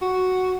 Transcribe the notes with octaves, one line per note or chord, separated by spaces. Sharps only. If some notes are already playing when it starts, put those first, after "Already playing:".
F#4